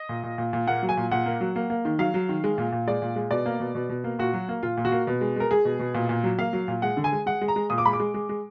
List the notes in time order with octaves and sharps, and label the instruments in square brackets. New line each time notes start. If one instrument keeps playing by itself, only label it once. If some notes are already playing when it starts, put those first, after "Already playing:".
Already playing: [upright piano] D#5
A#2
A#2
A#2
A#2
A#3 F#5
F#3
G#5
A#2
A#2 F#5
A#3
F#3
A#3
A#3
D#3
F#3 F5
F#3
D#3
G#3
A#2
A#2
G#3 D5
A#2
G#3
B2 D5
A#3
B2
B2
B2
A#3
A#2 F#4
F#3
A#3
A#2 F4
A#2
F#4
A#3
B2
G#3
G#3 A#4
G#3 G#4
B2
B2
A#2
A#2
F#3
A#3 F5
F#3
A#2
G#3 F#5
D3
G#5
G#3
G#3 F#5
G#3
A#5
G#3
A#2 D#6
D6
G#3 B5
D6
G#3
G#3
G#3